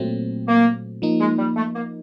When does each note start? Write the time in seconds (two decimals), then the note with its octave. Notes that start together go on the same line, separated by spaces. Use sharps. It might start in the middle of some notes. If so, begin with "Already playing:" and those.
Already playing: A#2 F#3 A3 C4
0.47 A#3
1.02 F3 A#3 D#4
1.20 G#3
1.38 G3
1.56 A3
1.75 A#3